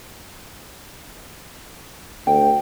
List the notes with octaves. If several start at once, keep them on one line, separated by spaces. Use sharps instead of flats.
D2 G5